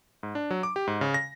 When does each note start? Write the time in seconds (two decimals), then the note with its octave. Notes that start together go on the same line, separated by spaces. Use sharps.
0.23 G#2
0.35 D4
0.51 F#3
0.63 D6
0.76 G4
0.87 G#2
1.01 C#3
1.14 A#6